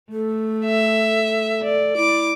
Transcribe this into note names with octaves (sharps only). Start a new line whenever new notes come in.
A3 A4
E5
D5
E4 D6